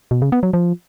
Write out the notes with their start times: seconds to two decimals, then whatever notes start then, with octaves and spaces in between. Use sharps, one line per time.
0.11 B2
0.22 C#3
0.32 B3
0.43 F#3
0.53 F3